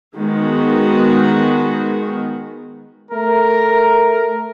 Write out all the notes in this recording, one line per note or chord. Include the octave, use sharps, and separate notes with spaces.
D#3 G#3 B3 F#4
A3 A#4